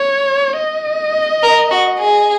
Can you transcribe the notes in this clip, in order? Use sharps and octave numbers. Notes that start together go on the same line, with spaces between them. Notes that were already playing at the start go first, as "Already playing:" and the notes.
Already playing: C#5
D#5
A#4
F#4
G#4